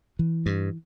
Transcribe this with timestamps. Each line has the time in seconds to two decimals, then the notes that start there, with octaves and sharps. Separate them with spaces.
0.19 E3
0.46 G2